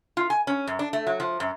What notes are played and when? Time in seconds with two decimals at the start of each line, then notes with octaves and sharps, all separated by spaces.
0.17 F4
0.30 G#5
0.47 C#4
0.67 F#2
0.79 D4
0.93 A3
1.07 F#3
1.20 F3
1.40 F#2